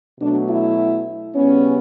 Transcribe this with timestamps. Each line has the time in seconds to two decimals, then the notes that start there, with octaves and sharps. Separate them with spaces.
0.20 B2 F#3 A3 D4
0.49 E4
1.35 C#3 G3 B3 C#4